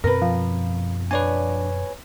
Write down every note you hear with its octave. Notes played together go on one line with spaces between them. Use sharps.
F#2 B2 C4 A#4 B4
F3
D4 B4 C#5 D5 G#5